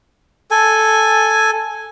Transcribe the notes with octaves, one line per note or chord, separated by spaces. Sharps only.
A4 G#5